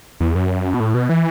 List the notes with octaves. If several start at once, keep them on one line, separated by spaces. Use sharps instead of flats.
E2
F#2
B2
A2
B2
E3